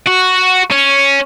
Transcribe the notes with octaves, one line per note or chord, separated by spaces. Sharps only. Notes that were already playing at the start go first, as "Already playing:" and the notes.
F#4
C#4